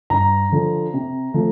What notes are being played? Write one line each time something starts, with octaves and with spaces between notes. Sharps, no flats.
G2 A#5
D3 F3
C3
F3 A3